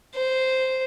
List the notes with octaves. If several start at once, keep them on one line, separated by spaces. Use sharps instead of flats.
C5